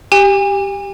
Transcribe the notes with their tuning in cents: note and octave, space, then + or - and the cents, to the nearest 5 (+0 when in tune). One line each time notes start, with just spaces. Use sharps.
G4 +0 G#5 -40